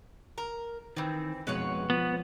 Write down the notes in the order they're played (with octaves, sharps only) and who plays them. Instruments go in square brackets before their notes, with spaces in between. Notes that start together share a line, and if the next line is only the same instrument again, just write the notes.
[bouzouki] A#4
[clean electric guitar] D#3 [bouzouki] E3 C4
[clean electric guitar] F2 B2 G#3 [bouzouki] B4 C#5 F#5
[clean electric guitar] F3 [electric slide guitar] B3